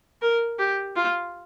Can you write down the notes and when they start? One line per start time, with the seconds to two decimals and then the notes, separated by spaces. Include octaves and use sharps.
0.22 A#4
0.59 G4
0.96 F4